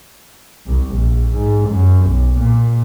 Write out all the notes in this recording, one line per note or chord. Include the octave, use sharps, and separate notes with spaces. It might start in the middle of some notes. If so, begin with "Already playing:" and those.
C2
A#1
G#2
F#2
B1
A#2